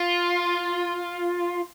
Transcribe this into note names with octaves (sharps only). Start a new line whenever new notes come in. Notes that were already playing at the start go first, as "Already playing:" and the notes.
Already playing: F4